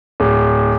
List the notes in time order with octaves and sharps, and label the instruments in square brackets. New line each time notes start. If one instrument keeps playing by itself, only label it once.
[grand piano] D1